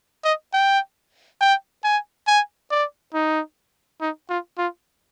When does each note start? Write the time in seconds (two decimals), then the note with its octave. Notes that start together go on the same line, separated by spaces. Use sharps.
0.24 D#5
0.53 G5
1.41 G5
1.84 G#5
2.27 G#5
2.71 D5
3.14 D#4
4.01 D#4
4.29 F4
4.58 F4